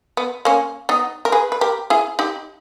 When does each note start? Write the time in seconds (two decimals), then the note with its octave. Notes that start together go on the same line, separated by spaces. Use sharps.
0.17 B3
0.45 A#3 C#4
0.89 B3 D#4
1.25 A#4
1.32 G#4 B4
1.52 B4
1.61 G4 A#4
1.90 E4 G#4
2.19 D#4 G4